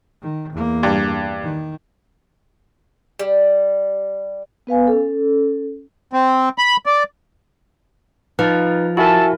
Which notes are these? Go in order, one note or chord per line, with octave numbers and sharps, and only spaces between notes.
D#3
E2 A#3
G2
D#3
G3
B3 B4 F5 G#5
C#4 A4
C4
B5
D5
F3 D#4 B4
E4 F#4 A4 A#4 E5 G#5 A5